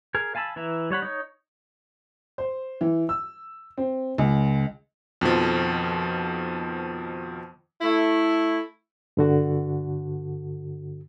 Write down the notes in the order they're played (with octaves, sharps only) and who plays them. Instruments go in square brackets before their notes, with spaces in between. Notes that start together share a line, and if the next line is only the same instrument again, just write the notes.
[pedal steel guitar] G#4 A#4
F5 G#5 A5 B5 E6
E3 E4 E5 A#5
G3 C#5 F#5 B5
D#4 C#5
[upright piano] C5
E3
E6
C4
C#2
[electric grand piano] F2 B2 D#3 F3
[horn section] A3 E4
[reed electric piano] G2 D3 F#4